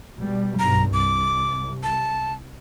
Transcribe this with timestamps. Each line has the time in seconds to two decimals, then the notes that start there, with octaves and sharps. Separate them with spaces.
0.17 B2 G3
0.59 B1 G2 A#5
0.93 C2 D6
1.83 A5